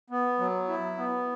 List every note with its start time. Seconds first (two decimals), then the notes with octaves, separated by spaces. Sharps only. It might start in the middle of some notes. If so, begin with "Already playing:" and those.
0.10 B3
0.39 F#3
0.68 E4
0.97 B3